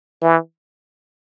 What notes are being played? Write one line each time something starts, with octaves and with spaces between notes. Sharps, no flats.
E3